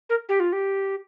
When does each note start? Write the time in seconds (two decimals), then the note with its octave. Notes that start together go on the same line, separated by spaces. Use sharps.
0.10 A#4
0.29 G4
0.40 F4
0.53 G4